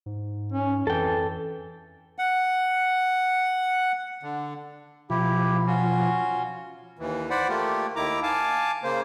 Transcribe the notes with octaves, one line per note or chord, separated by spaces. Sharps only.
G#2
C#4
F2 E3 A4 G5
F#5
D3
B2 F3 E4 G4
C#4 F4 F#4
D#2 E3
C5 D5 F#5 B5
A3 A#3 F4 G4
D#2 D#3 E4 A#5 D6
F5 G#5 A5 D6
C#3 A#3 C5